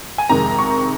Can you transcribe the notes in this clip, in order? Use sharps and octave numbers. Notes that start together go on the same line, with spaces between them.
G#5
F2 C3 D#3 G#3 A#5
C#6